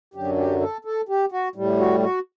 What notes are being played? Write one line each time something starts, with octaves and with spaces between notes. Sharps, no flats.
F#2 D3 F#3 G4
G4
A4
A4
G4
F#4
A2 G3
F#4
F#4